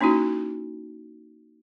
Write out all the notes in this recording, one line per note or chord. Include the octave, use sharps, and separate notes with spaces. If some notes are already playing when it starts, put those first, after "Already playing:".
A#3 C#4 D#4 E4 F#4